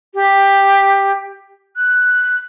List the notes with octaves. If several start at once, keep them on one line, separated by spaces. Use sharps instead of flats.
G4
F#6